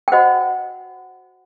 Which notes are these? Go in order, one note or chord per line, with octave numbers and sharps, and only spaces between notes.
G5
F#4 C5 D#5 F#5